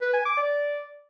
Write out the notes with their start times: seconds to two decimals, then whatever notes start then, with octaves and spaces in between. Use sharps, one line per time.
0.01 B4
0.13 G#5
0.25 D6
0.37 D5